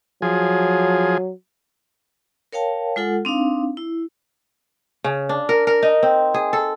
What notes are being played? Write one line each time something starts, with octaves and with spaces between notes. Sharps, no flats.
F3 F#3 G#4
A#4 C#5 F5 G5 A5
G#3 F4 A4 F#5
C4 D4 D#4 F5
E4
C#3
D4
A#4
A#4
D#4
C4
G#4
A4